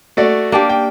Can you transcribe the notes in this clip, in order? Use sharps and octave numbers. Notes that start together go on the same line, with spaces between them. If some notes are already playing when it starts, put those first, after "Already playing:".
A3 F#4 D5
A#3 D4 G4
G5